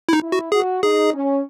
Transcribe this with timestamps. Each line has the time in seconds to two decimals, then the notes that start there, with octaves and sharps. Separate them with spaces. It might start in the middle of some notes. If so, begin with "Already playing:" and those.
0.09 E4
0.13 D#4
0.22 E4
0.32 F#4
0.52 F#4 G#4
0.82 D#4 G#4
1.13 C#4